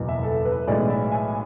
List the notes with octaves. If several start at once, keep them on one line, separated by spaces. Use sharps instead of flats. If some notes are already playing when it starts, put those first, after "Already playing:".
Already playing: F#1 E2 B2
E5
A4
B4
B1 A2 E3 G#3 B3 D5
E5
G#5